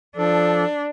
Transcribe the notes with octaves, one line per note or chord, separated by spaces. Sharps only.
F3 D4 A4